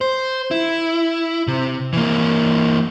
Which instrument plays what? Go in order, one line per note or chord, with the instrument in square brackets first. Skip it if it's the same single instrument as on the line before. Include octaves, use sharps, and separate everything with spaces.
[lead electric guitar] C5
E4
C3
E3 A#3